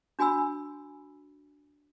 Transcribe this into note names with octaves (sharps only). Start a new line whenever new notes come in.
D4 F#4 G#5 B5 E6